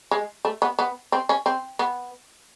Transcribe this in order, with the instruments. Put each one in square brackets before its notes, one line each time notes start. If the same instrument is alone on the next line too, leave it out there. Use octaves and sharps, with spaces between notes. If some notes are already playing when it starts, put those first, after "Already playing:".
[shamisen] G#3
A3
B3
B3
C4
C#4
C4
B3